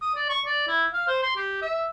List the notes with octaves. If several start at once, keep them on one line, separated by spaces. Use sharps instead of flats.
D#6
D5
C#6
D5
E4
F5
C5
C6
G4
E5